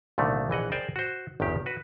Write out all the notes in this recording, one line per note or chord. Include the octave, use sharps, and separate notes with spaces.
C2 A#2 D3 D#3 A3
A#1 E3 D#5 F#5
G#4 A#4 C5 D5 G5 G#5
F#4 C5
G1 E2 D#3 G4
F#4 B4